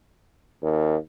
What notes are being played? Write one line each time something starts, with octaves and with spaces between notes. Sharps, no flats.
D#2